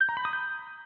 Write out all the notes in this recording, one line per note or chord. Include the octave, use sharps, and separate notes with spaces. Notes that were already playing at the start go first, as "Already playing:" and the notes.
G6
A#5
B5
D#6
G6